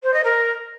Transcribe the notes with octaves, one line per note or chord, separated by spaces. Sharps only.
C5
D#5
A#4